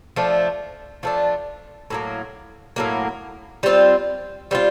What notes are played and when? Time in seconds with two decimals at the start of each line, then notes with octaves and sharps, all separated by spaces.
0.16 F3 A3 D4
1.03 F3 A3 D4
1.90 A2 F#3 A#3
2.76 A2 F#3 A#3
3.63 G3 C4 F4
4.51 G3 C4 F4